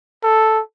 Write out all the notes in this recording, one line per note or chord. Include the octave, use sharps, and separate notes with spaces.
A4